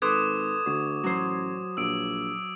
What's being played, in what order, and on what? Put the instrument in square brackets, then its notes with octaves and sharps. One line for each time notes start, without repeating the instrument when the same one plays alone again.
[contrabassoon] G#1 [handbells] A4 B4 C6 [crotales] D6 D#6 G#6
[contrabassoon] D2 [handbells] F#4
[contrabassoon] A1 [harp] F#3 C5
[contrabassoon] A#1 [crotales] E6 D7